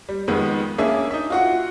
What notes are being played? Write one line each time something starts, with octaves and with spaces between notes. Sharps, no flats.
G3
F2 D#3 G#3 B3
A#3 C#4 D4 G#4 E5
D#4 E5
F4 F#4 F#5